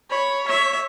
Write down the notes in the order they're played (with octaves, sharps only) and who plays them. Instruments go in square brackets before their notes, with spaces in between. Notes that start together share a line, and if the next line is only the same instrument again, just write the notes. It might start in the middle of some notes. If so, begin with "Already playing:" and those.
[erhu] C#5 [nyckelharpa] B5
[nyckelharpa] E5